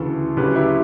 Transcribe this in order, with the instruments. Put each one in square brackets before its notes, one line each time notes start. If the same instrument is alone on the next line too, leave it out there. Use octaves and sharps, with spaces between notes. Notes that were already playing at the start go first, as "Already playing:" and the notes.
Already playing: [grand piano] D2 C#3 E3 A4
D2 C#3 F#3 G4 B4
E4 G4